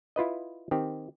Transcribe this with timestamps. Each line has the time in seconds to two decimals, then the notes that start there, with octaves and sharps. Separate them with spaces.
0.16 E4 F4 B4 D#5
0.71 D#3 C4 G4